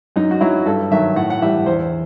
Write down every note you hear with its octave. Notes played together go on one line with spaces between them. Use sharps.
F#2 D#4
F#4
F#3 E4
G2 A4
D#3 F#3 E5
A2 F#5
F#5
E3 G3 E5
E2 C5